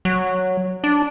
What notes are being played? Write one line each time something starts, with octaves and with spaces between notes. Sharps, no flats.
F#3
D4